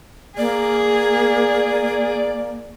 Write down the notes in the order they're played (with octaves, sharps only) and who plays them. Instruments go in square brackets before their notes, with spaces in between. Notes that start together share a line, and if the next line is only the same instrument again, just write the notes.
[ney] A#3 [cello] G#4 [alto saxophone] D5